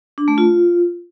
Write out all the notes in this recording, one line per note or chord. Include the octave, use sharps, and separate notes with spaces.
D4
A3
F4